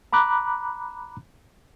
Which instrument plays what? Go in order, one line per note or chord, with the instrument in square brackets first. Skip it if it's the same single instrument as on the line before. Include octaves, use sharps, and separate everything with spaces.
[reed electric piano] A#5 B5 D6 F#6